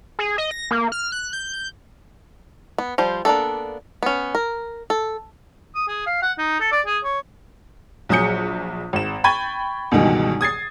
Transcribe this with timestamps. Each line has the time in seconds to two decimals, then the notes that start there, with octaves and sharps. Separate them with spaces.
0.19 G#4
0.38 D#5
0.51 A#6
0.71 A#3
0.92 F6
1.12 F#6
1.33 G6
1.53 G6
2.78 B3
2.98 F3 G3 C5
3.25 A#3 B3 D4 D#4 A4
4.03 B3 C#4
4.35 A#4
4.90 A4
5.75 D#6
5.88 G#4
6.06 F5
6.22 F#5
6.38 D#4
6.60 A4
6.72 D5
6.86 G#4
7.04 C#5
8.09 A#1 F#3 G#4 D#6 G6 C#7
8.93 G#1 E7
9.24 G5 B5 C#6 G#6 A6 D#7
9.91 C#2 G2 B2 D#3 E3
10.41 D#6 G#6 A6 C7